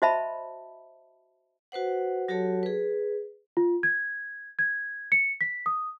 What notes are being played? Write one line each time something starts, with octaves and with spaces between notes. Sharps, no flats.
F#4 C5 D#5 E5 A5 B5
F#4 B4 C5 F#5
F#3 F#4 G4 A4 C#5 A5
G#4 B4
F4
G#6
G#6
C#7
B6
D#6